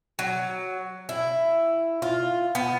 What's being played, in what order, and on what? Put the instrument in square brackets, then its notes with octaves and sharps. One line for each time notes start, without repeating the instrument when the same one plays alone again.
[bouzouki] F#3
E4
F4
B3